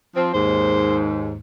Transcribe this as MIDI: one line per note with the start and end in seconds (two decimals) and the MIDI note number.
0.15 0.29 53
0.15 0.29 60
0.34 1.37 39
0.34 1.37 44
0.34 0.99 72